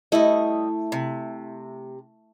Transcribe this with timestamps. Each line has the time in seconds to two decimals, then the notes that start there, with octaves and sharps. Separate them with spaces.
0.12 G3 A3 E4 D#5
0.92 C3